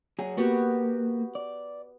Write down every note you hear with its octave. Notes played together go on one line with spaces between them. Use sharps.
F#3 G#4
A#3 B3 F#4 G4
D5